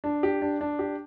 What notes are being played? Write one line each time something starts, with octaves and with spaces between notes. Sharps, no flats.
D4
G4
D4
D4
G4